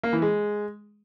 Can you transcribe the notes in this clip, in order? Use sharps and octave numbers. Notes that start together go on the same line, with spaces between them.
A#3
E3
G#3